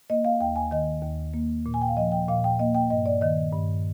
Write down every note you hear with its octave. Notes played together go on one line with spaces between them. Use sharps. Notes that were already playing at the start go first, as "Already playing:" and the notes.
A#3 D#5
F5
D#2 G5
G#5
D#3 D#5
D#2
A#3
A#2
G#5
G5
F5
F3 D#5
G5
A#2 F5
G5
A#3 D#5
G5
G2 D#5
D5
D#3 D#5
G2